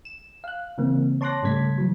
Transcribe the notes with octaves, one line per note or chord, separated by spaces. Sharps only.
E7
F5 F#6
C#3 E3 A#3 C4
C#5 A5 C6 D6 F#6 A#6
G#2 C#3 G3 A3 G#6 B6
E3 F#3